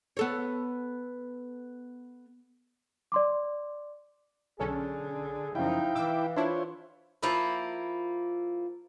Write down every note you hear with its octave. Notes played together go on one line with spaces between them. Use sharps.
B3 A4 C#5
D5 C6 D6
B1 D3 C#4 G#4 A4
F#2 C#3 F3 G3 D#4 E4 F5 G5
E3 D6 E6
D4 E4 F4 C5 C#5
F3 A#3 E4